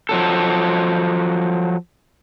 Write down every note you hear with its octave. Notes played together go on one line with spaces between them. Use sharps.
F3 F#3 A4